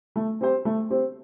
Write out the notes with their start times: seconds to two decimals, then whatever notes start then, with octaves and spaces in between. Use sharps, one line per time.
0.16 A3
0.41 C4 G4 C5
0.65 A3
0.90 C4 G4 C5